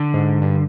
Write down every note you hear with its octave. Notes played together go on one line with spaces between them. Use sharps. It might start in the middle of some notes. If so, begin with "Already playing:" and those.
Already playing: D3
G#2
G2